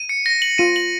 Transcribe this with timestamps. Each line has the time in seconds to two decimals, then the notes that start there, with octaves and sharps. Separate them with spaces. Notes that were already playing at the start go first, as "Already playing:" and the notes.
Already playing: D#7
0.09 C#7
0.26 A#6
0.42 F#7
0.58 F4 D#7
0.76 F#7